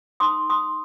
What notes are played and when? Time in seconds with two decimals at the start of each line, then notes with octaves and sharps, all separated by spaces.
0.20 D#4 B4 C6 D#6
0.50 C6 D#6